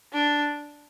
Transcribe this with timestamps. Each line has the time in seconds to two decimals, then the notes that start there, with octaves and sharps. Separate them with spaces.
0.13 D4